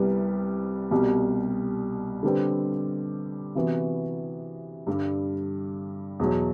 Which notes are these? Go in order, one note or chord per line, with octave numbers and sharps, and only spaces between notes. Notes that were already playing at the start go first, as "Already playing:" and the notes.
Already playing: C2 C3 G3 B3 E4
C2 B2 G3
D3 G3 C4 G4 B4
C3 E3 B3 F#4
G2 D3 G3
E2 B2 F#3